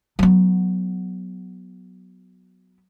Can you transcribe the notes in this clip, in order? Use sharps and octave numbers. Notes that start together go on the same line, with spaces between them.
F#3 B3